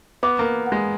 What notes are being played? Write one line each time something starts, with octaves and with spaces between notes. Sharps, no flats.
B3 D6
A#3
D6
F#5
G#3